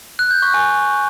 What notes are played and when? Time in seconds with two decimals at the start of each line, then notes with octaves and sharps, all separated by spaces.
0.19 F#6
0.31 G6
0.42 C#6
0.54 G#5